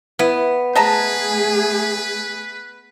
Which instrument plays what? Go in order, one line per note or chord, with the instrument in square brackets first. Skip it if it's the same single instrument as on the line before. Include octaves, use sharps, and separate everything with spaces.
[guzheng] B3 [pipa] E4
[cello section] A3 G#4 [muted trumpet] B4 [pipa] D#5 A5 A#5